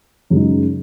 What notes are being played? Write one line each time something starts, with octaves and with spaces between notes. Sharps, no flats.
F#2 C#3 G#3 D#4